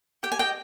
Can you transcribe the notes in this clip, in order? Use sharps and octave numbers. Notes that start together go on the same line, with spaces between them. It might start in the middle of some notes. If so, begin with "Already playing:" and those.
G4 G5
G#5
D#5 G5